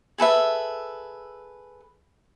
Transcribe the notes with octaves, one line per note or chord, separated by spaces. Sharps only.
G#4 A4 B4 E5